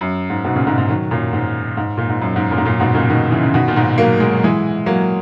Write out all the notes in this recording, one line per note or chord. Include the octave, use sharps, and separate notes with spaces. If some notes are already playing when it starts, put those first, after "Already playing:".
F#2
G#2
G#2 B2
A#2 C#3
G#2 B2
G#2
D#3 F#3
F#2 A#2
G#2
G#2
A#2
G#2
F#2
G#2
F#2 A#2
G#2
F#2 A#2
G#2 B2
A#2 C#3
B2 D#3
C#3 E3
C#3
B2 D#3
A#2
G#2 B2
F#3 A#3
G#3
F#3
E3 G#3
F#3 A#3